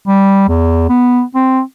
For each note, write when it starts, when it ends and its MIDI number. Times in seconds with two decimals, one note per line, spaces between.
0.07 0.45 55
0.48 0.85 40
0.89 1.22 59
1.35 1.61 60